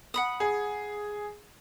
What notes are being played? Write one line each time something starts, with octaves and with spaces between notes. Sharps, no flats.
F#5 B5 D#6
G#4